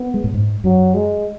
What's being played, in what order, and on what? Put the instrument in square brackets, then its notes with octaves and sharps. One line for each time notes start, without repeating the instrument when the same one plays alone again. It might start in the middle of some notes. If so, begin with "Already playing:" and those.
Already playing: [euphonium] B3
[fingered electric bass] G#3
A2
G#2
[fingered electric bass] F#2 [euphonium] F#3
[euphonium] G#3